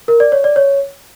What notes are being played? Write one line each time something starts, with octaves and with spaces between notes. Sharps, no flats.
A#4
D5
C#5
D5
C#5